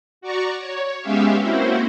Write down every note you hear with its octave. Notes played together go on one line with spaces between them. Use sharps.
F#4 D5 A#5 C#6
C#5
G#3 B3 C#4 G4 E5 F5
A#3 C4 C#4 E4 F#4 C5